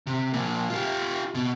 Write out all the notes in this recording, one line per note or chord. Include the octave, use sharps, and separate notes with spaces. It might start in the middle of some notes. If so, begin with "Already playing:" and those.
C3
A#2 F3
F4 G4
B2